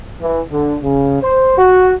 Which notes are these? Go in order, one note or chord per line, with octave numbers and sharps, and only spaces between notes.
E3
D3
C#3
C5
F#4